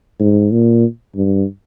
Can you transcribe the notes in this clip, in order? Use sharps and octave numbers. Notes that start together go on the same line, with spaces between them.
G#2
A#2
G2